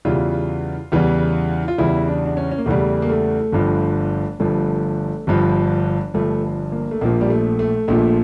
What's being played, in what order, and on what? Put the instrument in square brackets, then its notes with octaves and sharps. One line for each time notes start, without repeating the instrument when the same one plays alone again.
[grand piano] E2 C#3 E3 G3 F4
E2 C#3 E3 G3
F4
E2 C#3 E3 G3 E4
D4
D4
C#4
C#4
A#3
E2 C#3 E3 G3 A3
A#3
A3
G1 G2 F3
G1 G2 F3 A3
G1 G2 F3
G1 G2 F3 A3
A#3
A3
A#1 A#2 F3 A#3
G3
A3
A3
A#1 A#2 F3 A3